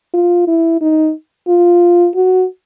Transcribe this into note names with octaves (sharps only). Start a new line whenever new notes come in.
F4
E4
D#4
F4
F#4